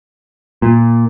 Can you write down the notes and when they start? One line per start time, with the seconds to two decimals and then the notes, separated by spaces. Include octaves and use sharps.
0.62 A#2